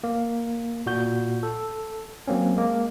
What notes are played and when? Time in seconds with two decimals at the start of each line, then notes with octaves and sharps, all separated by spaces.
0.04 A#3
0.86 A#2 F#4 G6
1.43 A4
2.28 F#3 A#3 C4 C#4
2.56 G#3 A#3